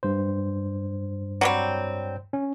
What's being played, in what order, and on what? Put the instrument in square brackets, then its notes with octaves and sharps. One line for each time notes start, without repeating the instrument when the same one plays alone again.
[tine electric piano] G2 C5
[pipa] F#3 G3 C4
[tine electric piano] C#4